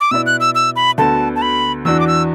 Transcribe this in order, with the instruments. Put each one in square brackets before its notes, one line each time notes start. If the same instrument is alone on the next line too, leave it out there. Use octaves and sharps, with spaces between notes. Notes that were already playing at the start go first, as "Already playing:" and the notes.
[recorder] D6
[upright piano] B2 B3 E4 D5 [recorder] E6
[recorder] F#6
E6
E6
B5
[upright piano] D2 D3 B3 F#4 A4 [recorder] A5
[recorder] A5
B5
[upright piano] E2 E3 D4 F#4 [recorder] E6
[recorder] D6
E6